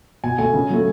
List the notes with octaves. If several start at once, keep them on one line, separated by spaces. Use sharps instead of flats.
B2 G#5
A3 G#5
C#3
F#3 A3